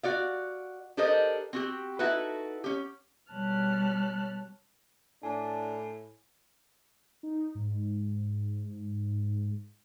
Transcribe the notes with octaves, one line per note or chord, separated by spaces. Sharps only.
F#4 D5 F5
D4 G4 A4 A#4 C5 D#5
C4 F#4 G4
D#4 E4 F#4 A4 B4
C#4 G4
B2 G3 C#5 A5 F6 F#6
A2 D4 G#5 A5
D#4
G#2